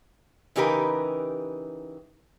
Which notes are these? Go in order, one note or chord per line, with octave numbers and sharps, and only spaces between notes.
C#3 E3 D#4 G4 A#4 B4